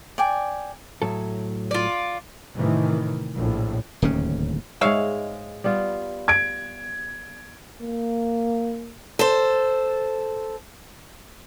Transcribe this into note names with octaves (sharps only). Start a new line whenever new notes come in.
D5 G5 G#5
A2 F#3 A4
F4 D5
A2 C3 D#3 E3
A#1 A2
D1 D#2 C#3 C#4
G#2 G#3 C#5 E5 F5
G3 B3 F4
G#6 D7
A#3
A4 C5